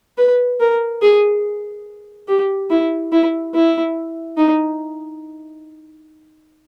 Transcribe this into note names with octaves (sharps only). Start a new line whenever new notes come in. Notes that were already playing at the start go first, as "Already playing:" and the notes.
B4
A#4
G#4
G4
E4
E4
E4
D#4